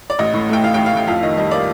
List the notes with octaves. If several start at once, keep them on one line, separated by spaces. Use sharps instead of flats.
D5
A1 D#5
A2
A3 G5
A1 F5
A1 G5
F5
A2 G5
F2 F5
D#3 D#5
G3 D#5
A#3 D5